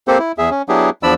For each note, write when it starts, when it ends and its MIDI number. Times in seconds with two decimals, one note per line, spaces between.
0.08 0.18 58
0.08 0.18 60
0.08 0.18 67
0.08 0.18 69
0.08 0.18 72
0.19 0.32 64
0.38 0.50 40
0.38 0.50 68
0.38 0.50 76
0.51 0.62 61
0.69 0.90 54
0.69 0.90 59
0.69 0.90 62
0.69 0.90 64
0.69 0.90 67
0.69 0.90 68
1.03 1.14 40
1.03 1.14 53
1.03 1.14 62
1.03 1.14 74
1.03 1.14 83
1.03 1.14 88